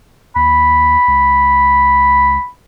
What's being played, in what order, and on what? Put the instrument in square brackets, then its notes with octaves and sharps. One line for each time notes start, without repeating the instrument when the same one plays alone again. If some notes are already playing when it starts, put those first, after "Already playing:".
[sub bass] D#2 [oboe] B5
[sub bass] C#2